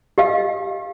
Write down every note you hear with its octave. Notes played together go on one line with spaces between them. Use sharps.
G4 D#5 F5